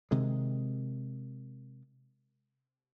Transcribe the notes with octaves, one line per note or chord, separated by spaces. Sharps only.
C3 D#3 G#3